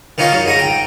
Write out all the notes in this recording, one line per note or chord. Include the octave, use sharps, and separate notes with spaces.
D#3 C#4 D#4 F4 C#5
F#3
G#2 G#5 A#5
G5